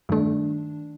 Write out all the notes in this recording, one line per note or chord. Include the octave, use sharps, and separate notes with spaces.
G2 D#3 A3 D4